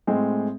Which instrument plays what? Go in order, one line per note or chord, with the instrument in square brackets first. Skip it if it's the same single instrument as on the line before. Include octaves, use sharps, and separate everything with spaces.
[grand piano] A2 G#3 C4